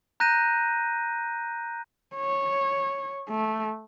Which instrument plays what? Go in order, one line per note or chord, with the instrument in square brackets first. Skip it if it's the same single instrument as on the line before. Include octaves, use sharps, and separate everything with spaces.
[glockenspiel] A#5 F#6 G6 A#6 D#7
[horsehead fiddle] C#5
A3